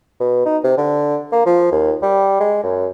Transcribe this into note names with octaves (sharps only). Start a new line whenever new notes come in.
B2
D#4
C3
D3
A#3
F3
D#2
G3
G#3
F#2